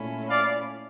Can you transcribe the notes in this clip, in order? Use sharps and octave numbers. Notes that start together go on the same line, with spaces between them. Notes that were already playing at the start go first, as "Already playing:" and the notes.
Already playing: A#2 A3 C#4 E4
D5 F5